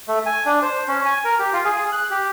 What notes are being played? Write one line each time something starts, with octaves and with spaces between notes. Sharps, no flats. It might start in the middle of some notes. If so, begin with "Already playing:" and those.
A3
G#5
D4
C5
C#4
G#5
A#4
G4
F4
G#4
F#6
G4